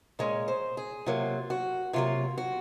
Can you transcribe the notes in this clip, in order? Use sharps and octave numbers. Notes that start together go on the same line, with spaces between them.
A#2 G#3 C#4 C#5
C5
G#4
C3 F#3 A#3 F4
F#4
C3 F#3 A#3 F4
F#4